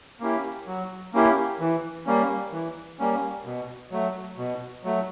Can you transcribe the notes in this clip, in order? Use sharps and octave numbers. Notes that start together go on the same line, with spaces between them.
A#3 C#4 E4 G4
F#3
A#3 C#4 E4 G4
E3
G3 A#3 C#4
E3
G3 A#3 C#4
B2
F#3 A3
B2
F#3 A3